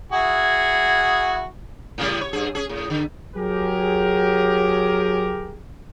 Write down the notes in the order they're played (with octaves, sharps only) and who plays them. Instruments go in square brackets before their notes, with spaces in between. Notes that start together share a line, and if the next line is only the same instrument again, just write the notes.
[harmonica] E4 F#4 G#4
[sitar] A2 C#3 G3
C#5
G2 G#4
C#4 G#4
A2
D3
[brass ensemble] F#3 G4 G#4 A#4